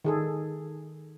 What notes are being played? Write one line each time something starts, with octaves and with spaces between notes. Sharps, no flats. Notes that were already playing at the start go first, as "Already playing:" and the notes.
D#3 G#4 A4